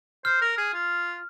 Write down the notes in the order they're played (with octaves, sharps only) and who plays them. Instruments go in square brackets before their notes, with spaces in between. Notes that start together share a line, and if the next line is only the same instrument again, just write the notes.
[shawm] C5 [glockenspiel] F6
[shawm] A#4
G#4
F4